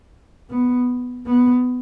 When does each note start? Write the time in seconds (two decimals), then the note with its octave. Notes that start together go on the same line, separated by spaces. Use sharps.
0.50 B3
1.27 B3